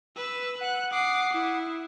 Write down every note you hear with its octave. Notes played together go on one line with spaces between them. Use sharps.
B4 E6
F#5 F#6
F#5 D6 D#6 C7
E4